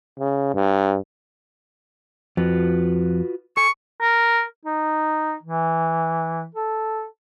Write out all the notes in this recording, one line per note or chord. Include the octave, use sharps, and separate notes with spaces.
C#3
G2
F2 F4 F#4 B4
A4 G#5 C#6
A#4
D#4
E3
A4